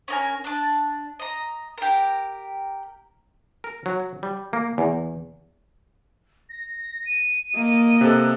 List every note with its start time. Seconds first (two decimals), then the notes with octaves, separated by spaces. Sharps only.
0.08 C#4 A#4 G#5
0.44 D4 A5
1.19 D#5 A#5
1.78 G4 A#4
3.64 A#4
3.86 F#3
4.23 G3
4.53 A#3
4.78 E2
6.49 A#6
7.06 D#7
7.56 A#3 D#5
8.01 C3 A4 F#6